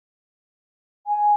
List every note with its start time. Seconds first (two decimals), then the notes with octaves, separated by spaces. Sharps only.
1.07 G#5